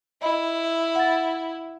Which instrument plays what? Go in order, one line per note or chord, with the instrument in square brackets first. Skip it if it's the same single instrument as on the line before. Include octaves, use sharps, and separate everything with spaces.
[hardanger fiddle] E4 [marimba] D#5 B5
[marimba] F#5 A6